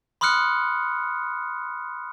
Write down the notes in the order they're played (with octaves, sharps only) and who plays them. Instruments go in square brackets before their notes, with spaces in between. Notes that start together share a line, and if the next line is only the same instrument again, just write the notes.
[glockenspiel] B5 C6 D#6 F6 F#6 C#7